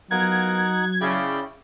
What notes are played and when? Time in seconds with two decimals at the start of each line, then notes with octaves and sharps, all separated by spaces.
0.11 F#3 B3 D#4 F4 A#4 F#5 G#6
1.01 C#3 E4 D5 G5